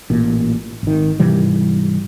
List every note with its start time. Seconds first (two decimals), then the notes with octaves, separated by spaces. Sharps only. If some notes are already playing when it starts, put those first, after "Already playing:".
0.10 A1 A#2
0.83 G#1 D#3
1.20 G#2 C3 E3 G3